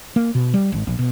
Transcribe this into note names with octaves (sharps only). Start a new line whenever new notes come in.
A#3
B2
G3
G#1
A#1
B2